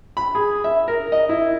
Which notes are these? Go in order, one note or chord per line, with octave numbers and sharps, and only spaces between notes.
B5
G#4
E5
A#4
D#5
E4